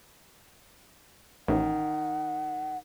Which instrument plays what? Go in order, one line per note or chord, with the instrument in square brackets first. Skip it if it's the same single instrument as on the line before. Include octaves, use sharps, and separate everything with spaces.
[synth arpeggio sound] A1 [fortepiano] D#3 [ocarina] F#5